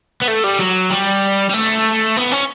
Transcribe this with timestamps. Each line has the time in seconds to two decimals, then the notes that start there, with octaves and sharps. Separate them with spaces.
0.22 B3
0.28 A3
0.44 G3
0.59 F#3
0.90 G3
1.50 G3
1.54 A3
2.17 B3
2.33 C#4